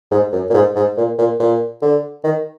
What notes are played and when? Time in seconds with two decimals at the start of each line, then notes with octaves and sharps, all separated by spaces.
0.11 G#2
0.33 F#2
0.50 A#2
0.54 G#2
0.76 G#2
0.97 A#2
1.18 A#2
1.40 A#2
1.82 D3
2.24 D#3